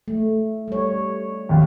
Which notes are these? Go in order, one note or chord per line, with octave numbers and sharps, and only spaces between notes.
A3
G3 C#5
G#1 D#2